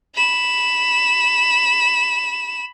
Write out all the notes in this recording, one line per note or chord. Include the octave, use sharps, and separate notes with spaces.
B5 E7